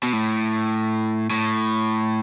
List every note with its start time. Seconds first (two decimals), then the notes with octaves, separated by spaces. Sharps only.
0.03 B2
0.13 A2
1.30 A2